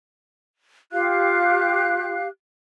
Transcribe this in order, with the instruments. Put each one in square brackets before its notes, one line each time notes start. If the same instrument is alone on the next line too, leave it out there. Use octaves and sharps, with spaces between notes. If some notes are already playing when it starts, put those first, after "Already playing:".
[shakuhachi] F4 [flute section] G4 F5 F#6